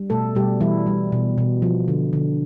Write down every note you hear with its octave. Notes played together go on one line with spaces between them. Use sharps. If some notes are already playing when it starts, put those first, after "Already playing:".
Already playing: G3
B2 A3 A4
B2 G3 G4
E3 G3 E4
G3
B2
B2
F3
D3
D3